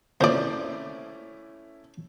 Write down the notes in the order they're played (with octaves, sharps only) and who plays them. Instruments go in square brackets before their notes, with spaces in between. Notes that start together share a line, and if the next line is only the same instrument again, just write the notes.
[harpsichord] C2 A#2 [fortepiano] A3 C#4 E4 [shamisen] C5 D5